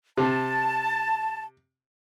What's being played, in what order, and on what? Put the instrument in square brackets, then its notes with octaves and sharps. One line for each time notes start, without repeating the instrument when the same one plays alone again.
[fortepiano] C3 [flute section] A5